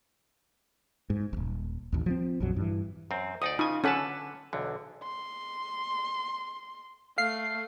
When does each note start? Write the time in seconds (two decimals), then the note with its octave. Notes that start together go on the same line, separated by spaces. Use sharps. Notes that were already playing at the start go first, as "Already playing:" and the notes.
1.10 G#2
1.33 D#1 G#1
1.92 A1 D#2
2.06 F3 F#3 C4
2.40 A#1 F2 F#3
2.56 G2 E3
3.11 F#2 C4
3.42 D2 D#4 D5 D#6
3.59 C#3 D#4 F4 G#5
3.84 D3 C#4 A4 B4 F#5 A5
4.53 B1 E2 D3
5.04 C6
7.18 A3 F5 C7